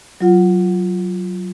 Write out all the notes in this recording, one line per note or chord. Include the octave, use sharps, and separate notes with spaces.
F#3 F4 F#5